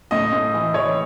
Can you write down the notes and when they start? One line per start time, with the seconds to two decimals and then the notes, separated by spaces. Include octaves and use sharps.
0.11 A2 D#5
0.33 A2
0.54 E3
0.74 E3 C#5